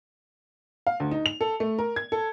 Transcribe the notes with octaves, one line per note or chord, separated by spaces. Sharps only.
F5
D2
D#4
F7
A4
A3
A#4
G#6
A4